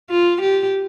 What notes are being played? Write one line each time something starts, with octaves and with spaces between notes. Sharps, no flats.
F4
G4